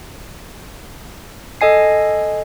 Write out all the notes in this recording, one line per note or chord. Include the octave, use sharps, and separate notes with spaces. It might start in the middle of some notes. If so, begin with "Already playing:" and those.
A4 D#5 G#5 C7